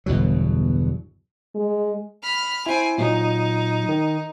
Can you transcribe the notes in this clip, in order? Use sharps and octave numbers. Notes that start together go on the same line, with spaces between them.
G1 E2 B2 F#3
G#3
B5 F6
C4 E4 G#5
A#2 F#3 D#4
D#3